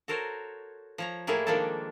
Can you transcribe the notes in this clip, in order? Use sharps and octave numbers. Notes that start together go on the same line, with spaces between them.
F#4 A4 A#4 C5 C#5
F3 C#5 A#5
A2 A#3 E4 G#4 C#5 E5
D#3 F3 G#3 A#3 D4 A4